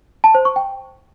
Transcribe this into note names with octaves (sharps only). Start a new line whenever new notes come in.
A5
C5
C#6
G5